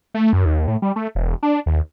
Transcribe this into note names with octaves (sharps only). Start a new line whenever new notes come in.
A3
F#2
D#2
A2
G3
A3
E1
D4
D#2